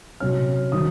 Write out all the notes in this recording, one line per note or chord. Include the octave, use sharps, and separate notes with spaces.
C3 F#3 C#4 F6
D#3 F#3 C4 D#4 D#6